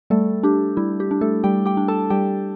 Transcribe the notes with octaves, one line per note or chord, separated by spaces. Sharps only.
G3 A3 A4
D4 G4
G3 E4
G4
D4
A3 A4
G3 G4 G5
G4 G5
D4
A4 A5
G3 G4 G5